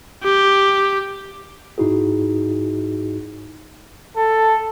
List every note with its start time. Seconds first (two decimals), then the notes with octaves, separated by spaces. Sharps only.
0.24 G4
1.78 G#2 D#4 E4 F#4 G#4
4.17 A4